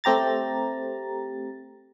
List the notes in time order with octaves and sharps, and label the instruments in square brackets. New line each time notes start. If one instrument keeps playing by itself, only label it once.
[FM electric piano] A3 C4 G4 A#5 A6